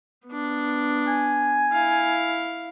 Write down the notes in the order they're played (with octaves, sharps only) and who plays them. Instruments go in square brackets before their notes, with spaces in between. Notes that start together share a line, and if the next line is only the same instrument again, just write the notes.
[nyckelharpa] B3 D4
[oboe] G#5
[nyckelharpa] E4 F5